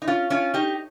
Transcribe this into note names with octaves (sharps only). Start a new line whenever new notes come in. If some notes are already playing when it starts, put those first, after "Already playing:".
D#4
C#4 F4
C#4 F4
D#4 G4